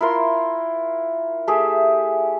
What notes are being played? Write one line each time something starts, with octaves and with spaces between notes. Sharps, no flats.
E4 F4 A#4 C6
A3 G4 G#4 E5